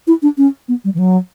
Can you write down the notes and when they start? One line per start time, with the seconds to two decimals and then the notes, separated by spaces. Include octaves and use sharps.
0.07 E4
0.22 D4
0.38 C#4
0.68 B3
0.84 G3
0.95 E3
0.99 F#3